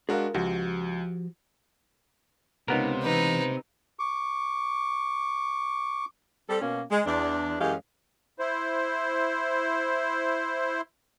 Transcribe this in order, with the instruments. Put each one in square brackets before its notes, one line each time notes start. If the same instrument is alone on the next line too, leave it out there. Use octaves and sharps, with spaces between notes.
[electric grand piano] G#3 D4 F#4 [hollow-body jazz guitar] G#4 A#4 F5
[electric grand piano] C#2 [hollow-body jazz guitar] F3 F#4 G4
[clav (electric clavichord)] C#2 B3 A#4 [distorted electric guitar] C3 [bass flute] D#4
[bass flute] E3 [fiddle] D#4 B4
[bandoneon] C#6 D6
[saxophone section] G3 C4 A4
B2 A#3 C#4
G#3
E2 D4
F#2 E3 G#3 C#4 G4 F5
[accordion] E4 C5